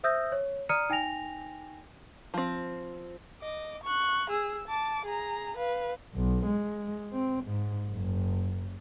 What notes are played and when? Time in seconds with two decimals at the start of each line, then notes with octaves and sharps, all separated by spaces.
0.04 C5 E5 D#6 E6 G6 A#6
0.32 C#5
0.69 D5 A#5 D#6 F6 C#7 D#7
0.90 D#4 G5 G#5 A#6 F7
2.34 F3 C4
3.40 D#5 D6
3.84 C#6 F#6
4.30 G#4 E6
4.68 A5 D6
5.05 G#4 A#5
5.57 B4 F5
6.15 B1
6.46 G#3
7.13 C4
7.44 G#2
7.90 F#1